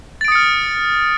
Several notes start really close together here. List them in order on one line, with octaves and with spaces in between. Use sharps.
A6 D7 D#6 C#7 F6